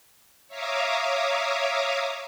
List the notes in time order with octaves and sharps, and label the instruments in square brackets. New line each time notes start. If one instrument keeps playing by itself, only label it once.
[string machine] C#5 E5 F5 A#5 D6 D#6